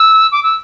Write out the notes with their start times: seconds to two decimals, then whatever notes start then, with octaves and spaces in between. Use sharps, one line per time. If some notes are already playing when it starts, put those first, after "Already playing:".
Already playing: E6
0.32 D6
0.43 E6